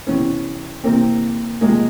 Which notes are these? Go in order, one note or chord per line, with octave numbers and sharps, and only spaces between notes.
C3 E3 B3 C#4
C3 E3 A#3 C4
C3 F3 G#3 A#3